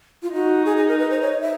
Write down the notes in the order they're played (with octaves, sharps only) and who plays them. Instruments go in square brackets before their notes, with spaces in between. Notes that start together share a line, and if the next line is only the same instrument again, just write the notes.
[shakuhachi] F4
[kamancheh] D#4 [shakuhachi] F#4
[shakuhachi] G#4
G#4
A#4
B4
C5
C#5
D#5
E5